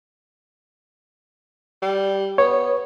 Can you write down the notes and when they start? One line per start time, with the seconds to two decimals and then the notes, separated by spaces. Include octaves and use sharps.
1.82 G3
2.38 B3 C#5